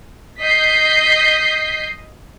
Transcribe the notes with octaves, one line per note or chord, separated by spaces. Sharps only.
D#5 G6 B6 C7